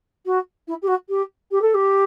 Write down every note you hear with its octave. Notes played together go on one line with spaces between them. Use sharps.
F#4
E4
G4
F#4
G4
G4
A4
G4